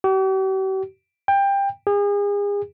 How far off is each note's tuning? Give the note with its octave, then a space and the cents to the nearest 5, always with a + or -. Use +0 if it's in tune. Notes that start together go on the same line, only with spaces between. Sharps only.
G4 -45
G5 +20
G#4 -35